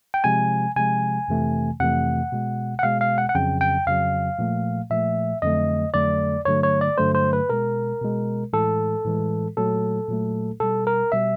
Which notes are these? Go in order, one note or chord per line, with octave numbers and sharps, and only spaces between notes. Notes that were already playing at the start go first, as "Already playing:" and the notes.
G5
C3 F3 G#3 G#5
C3 F3 G#3 G#5
F2 C3 E3 A3
F2 C3 E3 A3 F#5
B2 G#3
F#5
B2 G#3 F5
F5
F#5
F#5
F2 C#3 F#3 G5
G5
F2 C#3 F#3 F5
A#2 F3 A3
A#2 F3 A3 E5
F2 D3 F#3 A3 D#5
F2 D3 F#3 A3 D5
G2 D3 F#3 A3 C#5
C#5
D5
G2 D3 F#3 A3 C5
C5
B4
B2 G#3 A#4
B2 G#3
A2 E3 G#3 A4
A2 E3 G#3
A#2 F#3 A3 A4
A#2 F#3 A3
B2 G3 A4
A#4
B2 G3 E5